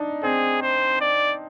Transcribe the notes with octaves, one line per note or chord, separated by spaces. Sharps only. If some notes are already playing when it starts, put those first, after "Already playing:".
Already playing: D4 D#4
C4 G#4
C5
D5